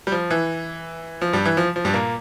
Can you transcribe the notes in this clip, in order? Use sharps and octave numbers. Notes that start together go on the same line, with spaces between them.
G3
F3
E3
F3
G2 G3
E3
F3
F3
G2 G3
A#2 A#3